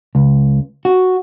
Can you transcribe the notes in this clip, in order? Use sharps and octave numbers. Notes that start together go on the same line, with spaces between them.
C#2
F#4